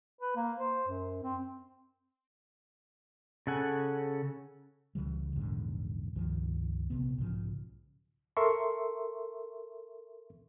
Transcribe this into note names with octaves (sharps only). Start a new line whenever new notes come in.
B4
A#3
C5
F#2
C4
C#3 A4 F#5 G#5
C#2 C#3 E3 G3
A#1 E2 G#2 D3
C#2 G2 D#3 F3
A#1 C3 B3
B1 G#2 C#3 F3
A4 A#4 E5 C6 C#6